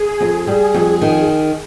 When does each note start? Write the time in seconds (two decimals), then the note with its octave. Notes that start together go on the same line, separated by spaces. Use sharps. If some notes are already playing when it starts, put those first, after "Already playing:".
Already playing: G#4
0.21 F2
0.47 G3 G#4
0.74 F2
1.01 D#3